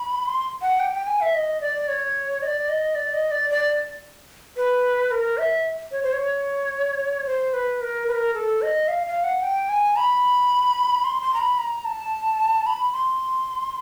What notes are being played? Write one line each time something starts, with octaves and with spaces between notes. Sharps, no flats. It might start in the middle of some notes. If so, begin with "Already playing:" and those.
Already playing: B5
C6
F#5
G5
G5
G#5
E5
D#5
D5
C#5
D#5
D5
D#5
D5
D#5
D5
D5
B4
A#4
E5
C#5
C5
C#5
C5
B4
A#4
B4
A#4
A4
D#5
F5
F5
F#5
G5
G#5
B5
C6
C6
A#5
B5
A#5
A5
B5
C6